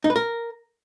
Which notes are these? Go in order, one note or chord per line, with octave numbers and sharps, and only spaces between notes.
D#4
B4
A#4